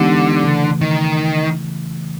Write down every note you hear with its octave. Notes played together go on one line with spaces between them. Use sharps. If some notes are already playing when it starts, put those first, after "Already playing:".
Already playing: D3 E3 G#3 B3 D#4 G4
C#3 E3 A3
D#3